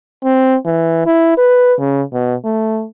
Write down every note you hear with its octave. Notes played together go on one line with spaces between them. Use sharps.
C4
E3
E4
B4
C#3
B2
A3